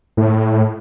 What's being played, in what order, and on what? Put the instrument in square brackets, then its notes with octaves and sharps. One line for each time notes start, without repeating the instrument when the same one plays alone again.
[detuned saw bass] A2